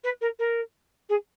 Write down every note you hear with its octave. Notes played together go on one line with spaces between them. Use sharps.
B4
A#4
A#4
G#4